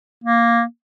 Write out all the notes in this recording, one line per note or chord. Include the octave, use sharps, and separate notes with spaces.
A#3